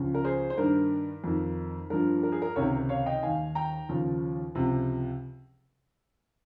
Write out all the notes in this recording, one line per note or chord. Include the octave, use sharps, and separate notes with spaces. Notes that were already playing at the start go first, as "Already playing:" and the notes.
Already playing: C#2 C#3 F3
A#4
G#4 C5
C5
G2 D#3 A#4
F2 D#3
G2 F3 A#4
A#4
G#4
A#4
C#2 C3 D#3 A#4 C#5
C#5 F5
D#5 G5
D#2 D#3 F5 G#5
G5 A#5
D#2 C#3 F3
C#2 C3 F3